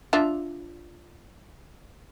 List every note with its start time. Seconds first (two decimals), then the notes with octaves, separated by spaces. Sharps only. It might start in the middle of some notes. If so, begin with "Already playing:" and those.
0.13 D4 F4 E5